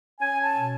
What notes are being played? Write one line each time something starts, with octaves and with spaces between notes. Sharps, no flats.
C#4 G#5
A5
B2